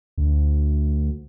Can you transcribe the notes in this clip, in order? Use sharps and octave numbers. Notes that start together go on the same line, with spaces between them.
D2